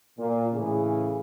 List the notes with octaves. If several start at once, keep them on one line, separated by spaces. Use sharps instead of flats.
A#2
A2 C#3 E3 C#4 G#4